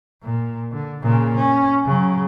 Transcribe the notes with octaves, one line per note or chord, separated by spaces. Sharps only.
A#2
D3
A#2 C#3
C#4
C#3 F#3